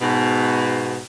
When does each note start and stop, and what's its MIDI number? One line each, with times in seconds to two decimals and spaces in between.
0.01 0.98 44
0.01 0.98 47